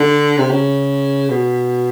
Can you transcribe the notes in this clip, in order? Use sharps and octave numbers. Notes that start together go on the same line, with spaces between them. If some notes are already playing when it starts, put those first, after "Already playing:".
Already playing: D3
C3
C#3
B2